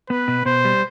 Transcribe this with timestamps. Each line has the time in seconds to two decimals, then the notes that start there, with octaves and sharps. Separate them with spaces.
0.10 B3 B4
0.28 B2
0.46 B2 C5
0.65 G3